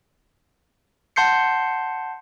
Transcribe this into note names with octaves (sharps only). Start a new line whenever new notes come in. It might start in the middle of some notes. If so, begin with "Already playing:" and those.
F#5 A5 C6 G6 C7 C#7